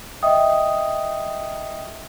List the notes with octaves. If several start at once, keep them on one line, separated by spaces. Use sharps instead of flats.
D#5 E5 G5 D#6